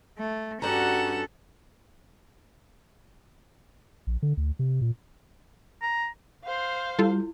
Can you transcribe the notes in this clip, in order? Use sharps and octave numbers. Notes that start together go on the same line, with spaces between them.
A3
G2 C#4 F#4 G4 A4 F#5 A#5 E7
A#1
D3
D2
C3
A#2
A#5
C5 F5
G3 E4 F4 A4